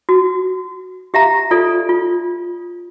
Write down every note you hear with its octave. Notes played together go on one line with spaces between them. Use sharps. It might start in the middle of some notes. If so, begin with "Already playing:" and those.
F#4
G4 E5 F5 A#5
F4 A4 D5
F4